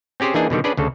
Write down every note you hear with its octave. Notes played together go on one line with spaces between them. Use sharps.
C4 C#4 G4 G#4 C5
E3 A#3 D4 D#4 G#4
B2 D3 D#3 G3
C#4 D4 G#4 B4 D5
D2 C#3 A4